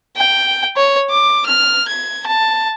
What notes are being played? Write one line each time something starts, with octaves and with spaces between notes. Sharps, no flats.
G5
C#5
D6
F6
G#6
A5